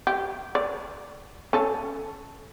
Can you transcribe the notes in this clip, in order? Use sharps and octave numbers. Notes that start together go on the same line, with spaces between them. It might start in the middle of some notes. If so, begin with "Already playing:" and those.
G4
D5
C#4 A4